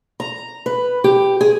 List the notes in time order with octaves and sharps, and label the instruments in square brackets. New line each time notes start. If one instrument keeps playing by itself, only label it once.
[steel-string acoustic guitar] A#5
B4
G4
G#4